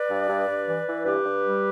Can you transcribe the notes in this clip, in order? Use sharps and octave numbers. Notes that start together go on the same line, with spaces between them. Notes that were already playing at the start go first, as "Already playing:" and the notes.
Already playing: B4 D5
G2
G2
G2
E3
E3
G2 G4 B4
G2
G3